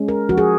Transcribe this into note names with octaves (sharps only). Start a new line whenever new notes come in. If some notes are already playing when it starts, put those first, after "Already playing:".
Already playing: G#3 C#4
A#4
F3 F#4
G#4